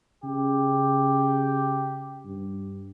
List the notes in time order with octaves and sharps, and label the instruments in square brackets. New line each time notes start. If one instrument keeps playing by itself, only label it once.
[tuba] C#3 [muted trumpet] G4
[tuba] G2